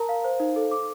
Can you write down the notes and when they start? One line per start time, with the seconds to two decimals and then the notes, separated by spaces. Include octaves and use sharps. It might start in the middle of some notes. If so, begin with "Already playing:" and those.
Already playing: A#4 A5 A#5
0.09 F5
0.24 C5
0.40 D#4
0.56 A4
0.71 D6